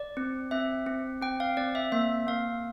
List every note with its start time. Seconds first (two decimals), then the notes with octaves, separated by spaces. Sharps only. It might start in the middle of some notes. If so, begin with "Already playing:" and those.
Already playing: D5
0.17 C4
0.51 C4 E5
0.86 C4
1.21 C4 G5
1.40 F5
1.57 C4 D5
1.75 E5
1.92 A#3 E5
2.27 A#3 F5